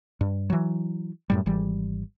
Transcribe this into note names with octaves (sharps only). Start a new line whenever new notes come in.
G2
E3 F#3
F#2 A2 G3
G#1 E3 G3